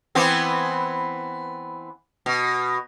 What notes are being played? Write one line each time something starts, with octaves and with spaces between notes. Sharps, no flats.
E3 B3 C4
B2